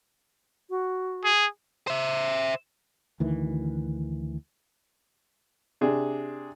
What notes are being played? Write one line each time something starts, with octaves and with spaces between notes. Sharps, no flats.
F#4
G#4
C5 E5
D2 D#3 E3
C3 D4 G#4